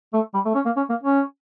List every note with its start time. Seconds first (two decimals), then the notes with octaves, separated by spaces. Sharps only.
0.13 A3
0.34 G3
0.45 A3
0.55 C#4
0.65 A#3
0.76 C#4
0.89 A#3
1.03 C#4